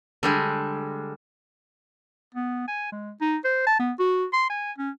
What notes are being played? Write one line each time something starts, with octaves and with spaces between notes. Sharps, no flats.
D3 G3 G#3
B3
G#5
G#3
D#4
C5
A5
B3
F#4
C6
G#5
C#4